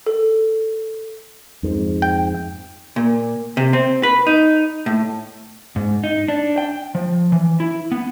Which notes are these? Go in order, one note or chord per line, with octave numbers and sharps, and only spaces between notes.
A4
F2 G#2
G5
A#2
C3
C4
B4
D#4
A2
G#2
D#4
D4
G5
F3
E3
E4
B3